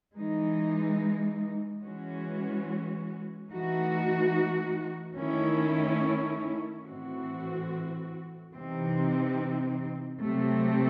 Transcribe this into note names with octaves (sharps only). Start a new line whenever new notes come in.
E3 G#3 D#4
E3 G#3 C#4 F#4
E3 A3 D#4 F#4
D#3 A3 C#4 E4
A2 E3 C4 F#4
C3 E3 C4 D#4
C3 F#3 A3 C4